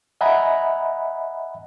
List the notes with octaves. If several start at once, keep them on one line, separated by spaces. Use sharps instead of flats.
D#5 E5 F#5 G#5 A#5 B5